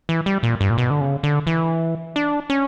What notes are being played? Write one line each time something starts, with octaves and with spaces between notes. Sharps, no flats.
E3
G3
A#2
G2
A#2
B2
D3
C#3
D3
E3
D4
C#4